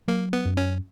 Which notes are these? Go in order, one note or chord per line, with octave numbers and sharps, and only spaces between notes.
F#3 A#3
B3
F#2
C#4